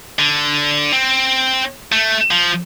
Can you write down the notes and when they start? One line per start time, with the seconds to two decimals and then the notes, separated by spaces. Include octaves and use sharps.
0.19 D3
0.93 C4
1.92 A3
2.31 F3